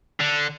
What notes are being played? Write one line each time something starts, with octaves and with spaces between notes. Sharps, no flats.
D3